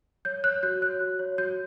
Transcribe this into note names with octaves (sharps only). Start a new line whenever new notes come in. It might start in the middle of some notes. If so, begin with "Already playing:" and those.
C#5 G6
C#5 F#6
F#4 G6
C#5 F#6
F#4
C#5
F#4 G6